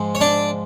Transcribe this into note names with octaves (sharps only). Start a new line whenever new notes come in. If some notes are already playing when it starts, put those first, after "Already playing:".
Already playing: G#2 F3 G#3
C#5
D4 D5